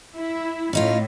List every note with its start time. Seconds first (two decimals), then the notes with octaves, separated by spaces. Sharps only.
0.14 E4
0.73 A2 C#4 D#4 F4